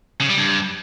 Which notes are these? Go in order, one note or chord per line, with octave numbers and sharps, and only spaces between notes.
C#3
G3
G2